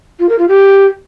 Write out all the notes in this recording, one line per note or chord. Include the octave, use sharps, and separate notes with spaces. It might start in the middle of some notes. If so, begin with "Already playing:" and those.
F4
A#4
F4
G4